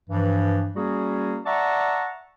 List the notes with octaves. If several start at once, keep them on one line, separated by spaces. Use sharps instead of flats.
G2 E3 F3
G3 A#3 C#4 F#4 G#4
D5 E5 F#5 A5 A#5 C#6